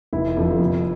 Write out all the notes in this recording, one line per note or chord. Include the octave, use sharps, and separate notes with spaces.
F1 E4
F2 D3 F3
F1